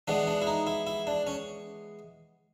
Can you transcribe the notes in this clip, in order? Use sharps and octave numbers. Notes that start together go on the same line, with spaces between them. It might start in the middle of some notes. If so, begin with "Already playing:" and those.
E3 G#3 B3 D4
D4
E4
D#4
E4
E4
D4
C#4